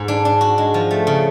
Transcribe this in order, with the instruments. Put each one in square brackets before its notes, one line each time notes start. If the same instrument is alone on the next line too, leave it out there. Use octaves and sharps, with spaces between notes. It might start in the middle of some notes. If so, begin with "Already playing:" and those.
Already playing: [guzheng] G#2
D4
D4
F#4
G#3
F3
A3
C#3